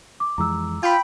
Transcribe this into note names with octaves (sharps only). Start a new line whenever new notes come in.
D6
F2 E3 G#3 A#5 D6 E6
F4 G5 B5